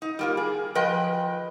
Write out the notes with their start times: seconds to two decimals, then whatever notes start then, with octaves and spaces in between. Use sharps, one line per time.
0.02 D#4
0.19 G3 A#3 F4
0.37 G#4
0.75 F3 B4 D#5 G5